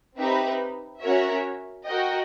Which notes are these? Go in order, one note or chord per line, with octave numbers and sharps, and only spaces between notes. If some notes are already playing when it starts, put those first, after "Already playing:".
C4 D#4 G4 B4 E5
C#4 F#4 A#4 C#5 E5
F#4 A#4 D#5 G5